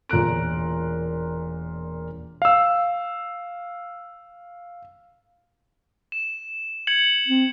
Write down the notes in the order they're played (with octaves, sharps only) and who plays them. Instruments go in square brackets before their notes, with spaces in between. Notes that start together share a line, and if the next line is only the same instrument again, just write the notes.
[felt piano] E1 A#2 A#5 F#6 D7
[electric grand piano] F5 E6
[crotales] E7
G#6 C#7 F#7
[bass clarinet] C4